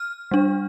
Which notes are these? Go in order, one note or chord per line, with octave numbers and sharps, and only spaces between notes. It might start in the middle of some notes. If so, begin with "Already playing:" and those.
Already playing: F6
G3 D4